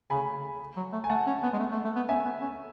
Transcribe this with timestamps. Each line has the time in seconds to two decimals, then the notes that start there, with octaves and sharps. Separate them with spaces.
0.10 C#3 G#5 B5
0.77 F#3
0.93 A3
1.04 G#5
1.10 A3 F#5 A5
1.27 C#4
1.43 B3
1.53 G#3
1.59 A3
1.72 A3
1.84 A3
1.96 B3
2.09 C#4 E5 G#5
2.25 B3
2.42 C#4